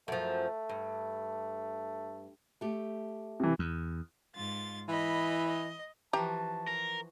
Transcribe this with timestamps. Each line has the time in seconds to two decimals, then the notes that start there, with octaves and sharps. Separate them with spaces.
0.08 F#2 F3 A3
0.69 G2
2.61 A3 G4
3.40 C3 E3
3.59 E2
4.34 G#2 F4 A6
4.89 E3 D#5 B5
5.47 D#5
6.13 E3 F3 F#4 G4 A5 A#5
6.67 A#4